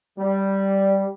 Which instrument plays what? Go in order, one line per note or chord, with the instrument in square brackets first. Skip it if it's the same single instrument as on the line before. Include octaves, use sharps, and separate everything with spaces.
[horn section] G3